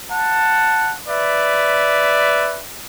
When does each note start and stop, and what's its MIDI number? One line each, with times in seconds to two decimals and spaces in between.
0.10 0.93 78
0.10 0.93 81
1.07 2.62 71
1.07 2.62 74
1.07 2.62 76